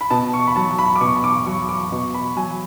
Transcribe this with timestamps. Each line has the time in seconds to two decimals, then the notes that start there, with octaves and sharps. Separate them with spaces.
0.01 B5
0.10 B2 A5
0.34 C#6
0.47 B5
0.56 F#3 A5
0.79 B5
0.96 D6
1.01 B2 C#6
1.24 D6
1.46 F#3 C#6
1.69 D6
1.92 B2 C#6
2.14 B5
2.36 F#3 G#5